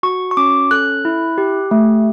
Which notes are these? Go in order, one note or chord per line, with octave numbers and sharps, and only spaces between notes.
F#4 C#6
C#6
C#4 D6
A4 F#6
E4
G4
A3